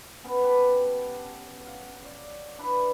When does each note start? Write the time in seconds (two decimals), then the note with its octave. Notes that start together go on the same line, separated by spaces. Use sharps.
0.24 B3 C#4
0.43 G4 B4 A5
1.65 F5 F#5
2.03 C#5 D5
2.59 D4 E4 B4